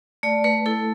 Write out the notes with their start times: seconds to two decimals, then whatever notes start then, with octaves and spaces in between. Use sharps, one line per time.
0.23 A3 D5
0.44 A3 B4
0.66 E4 A4